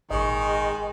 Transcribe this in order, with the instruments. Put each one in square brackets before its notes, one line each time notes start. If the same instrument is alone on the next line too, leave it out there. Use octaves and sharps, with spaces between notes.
[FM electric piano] G#1 A#2 [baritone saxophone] D#3 [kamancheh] G#3 [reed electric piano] D#5 C#6